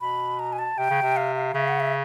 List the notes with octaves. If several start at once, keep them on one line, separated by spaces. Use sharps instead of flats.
B2 B5
A#5
G#5
A5
C3 G5
C#3
C3
F5
F5
C#3 E5
F#5
E5